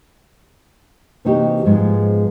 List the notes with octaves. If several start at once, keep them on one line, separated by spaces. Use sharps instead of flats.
C3 E3 A#3 D#4 F#4 G4
G#2 F3 G#3 B3